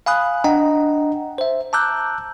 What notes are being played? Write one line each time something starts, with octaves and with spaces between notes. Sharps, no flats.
F5 G#5 B5 D#6 F#6
D4 D#5 F#5 G5 A#5
C5 E5
A5 A#5 D6 E6 F#6 G6